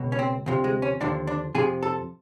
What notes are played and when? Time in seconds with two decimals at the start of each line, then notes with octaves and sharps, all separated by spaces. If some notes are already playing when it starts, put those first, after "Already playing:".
Already playing: C#2 B2
0.12 C#4
0.19 C4
0.46 D2 C3 F3
0.64 G#3
0.82 C#4
1.00 D#2 D3 F3 D4
1.27 D4
1.55 F2 C3 F3 G#4
1.83 A4